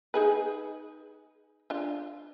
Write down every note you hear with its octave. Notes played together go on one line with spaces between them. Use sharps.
D#4 G#4 B4
D4 F4